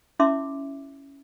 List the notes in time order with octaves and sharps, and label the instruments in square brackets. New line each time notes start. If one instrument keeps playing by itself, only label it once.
[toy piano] C#4 E4 E5 C6 D6